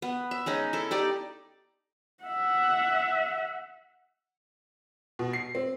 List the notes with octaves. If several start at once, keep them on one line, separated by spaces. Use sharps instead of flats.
B3
E5
G#3 C#4 D#4
E4 A4
D#4 G4 D5
E5 F#5
B2
C7
C4